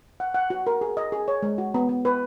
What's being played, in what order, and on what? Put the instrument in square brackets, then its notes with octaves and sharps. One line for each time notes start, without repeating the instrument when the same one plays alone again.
[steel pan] F#5
F#5
F#4
A#4
G#4
D#5
G#4
C#5
G#3
F#4
B3
B3
B4